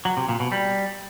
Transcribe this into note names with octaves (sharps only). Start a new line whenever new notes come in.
F#3
C3
A#2
B2
G3